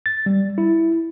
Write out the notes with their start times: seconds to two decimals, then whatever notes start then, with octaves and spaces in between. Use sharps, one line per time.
0.06 A6
0.26 G3
0.58 E4